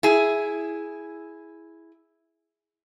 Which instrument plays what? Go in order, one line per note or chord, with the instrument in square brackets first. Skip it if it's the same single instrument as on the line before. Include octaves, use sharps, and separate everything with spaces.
[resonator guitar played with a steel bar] E4 G#4